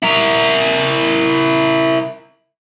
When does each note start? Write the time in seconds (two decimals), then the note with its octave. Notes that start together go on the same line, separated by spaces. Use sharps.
0.03 E4 A#4